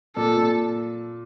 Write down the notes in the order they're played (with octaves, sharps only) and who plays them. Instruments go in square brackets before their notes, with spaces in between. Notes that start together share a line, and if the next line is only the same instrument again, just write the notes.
[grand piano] A#2 [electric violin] A4
[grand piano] A#2